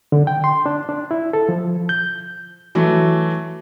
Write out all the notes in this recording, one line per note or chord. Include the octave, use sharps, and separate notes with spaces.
D3
G5
C6
D4
D4
E4
A4
F3
G6
E3 F#3 A3